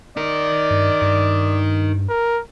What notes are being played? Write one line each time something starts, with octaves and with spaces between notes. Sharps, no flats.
D#4 A#4 D5
G2
G2
A#4